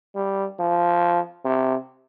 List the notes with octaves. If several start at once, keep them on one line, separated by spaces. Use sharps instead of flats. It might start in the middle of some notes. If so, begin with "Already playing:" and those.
G3
F3
C3